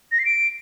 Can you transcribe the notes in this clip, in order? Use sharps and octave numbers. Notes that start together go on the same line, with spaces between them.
A#6
C7
D7